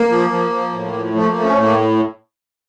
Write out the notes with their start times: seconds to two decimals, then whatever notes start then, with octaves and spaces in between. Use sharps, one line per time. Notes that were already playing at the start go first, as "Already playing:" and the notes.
Already playing: A#3
0.09 F3
0.30 F3
0.51 F3
0.72 A2
0.93 F3
1.13 F3 A3
1.29 A#3
1.34 A3
1.44 C#4
1.55 A2
1.61 A#3